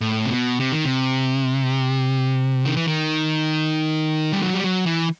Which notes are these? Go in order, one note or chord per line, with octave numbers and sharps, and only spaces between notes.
A2
C3
B2
C3
D#3
C3
D#3
E3
D#3
G3
F#3
G3
F#3
E3